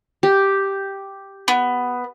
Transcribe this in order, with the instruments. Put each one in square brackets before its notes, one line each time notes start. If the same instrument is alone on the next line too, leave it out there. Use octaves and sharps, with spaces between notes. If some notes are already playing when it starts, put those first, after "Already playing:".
[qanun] G4
[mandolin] B3